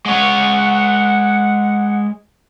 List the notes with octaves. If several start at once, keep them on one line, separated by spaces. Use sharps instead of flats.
G#3 C#5 F#5